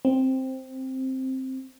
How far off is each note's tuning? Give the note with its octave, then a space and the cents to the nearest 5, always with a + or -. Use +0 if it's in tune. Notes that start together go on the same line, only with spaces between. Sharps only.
C4 +5